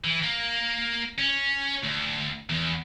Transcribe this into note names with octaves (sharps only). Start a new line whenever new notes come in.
E3
A#3
C#4
D2
E2